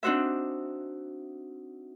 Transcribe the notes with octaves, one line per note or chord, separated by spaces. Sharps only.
C4 D4 D#4 F#4 C5 E5